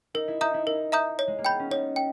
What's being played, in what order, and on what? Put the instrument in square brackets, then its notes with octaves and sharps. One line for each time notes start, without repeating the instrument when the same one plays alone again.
[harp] D#4 [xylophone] A#4
[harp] E4
[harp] D#4 [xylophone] E5 A#5 D#6 G6
[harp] E4
[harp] D#4 [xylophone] A#4
[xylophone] E5 A#5 D#6 G6
C#5
[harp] G#3
A#3
[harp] B3 [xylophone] G5 B5 G6
[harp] C#4
[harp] D#4 [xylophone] C#5
[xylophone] G5